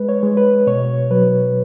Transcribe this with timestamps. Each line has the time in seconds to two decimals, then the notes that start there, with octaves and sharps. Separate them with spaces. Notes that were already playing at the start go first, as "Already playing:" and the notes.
Already playing: G#3 B4
0.09 C#5
0.23 G#3
0.37 B4
0.67 B2 C#5
1.11 F#3 B4